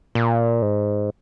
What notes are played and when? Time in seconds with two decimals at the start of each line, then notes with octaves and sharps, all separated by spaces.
0.15 A#2
0.62 G#2